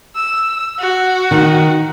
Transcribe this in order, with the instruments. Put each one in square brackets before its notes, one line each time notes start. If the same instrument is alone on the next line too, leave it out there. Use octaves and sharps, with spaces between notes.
[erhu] E6
F#4
[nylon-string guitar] D#3